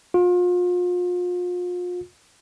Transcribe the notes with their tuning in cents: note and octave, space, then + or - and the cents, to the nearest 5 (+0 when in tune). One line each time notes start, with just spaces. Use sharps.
F4 +35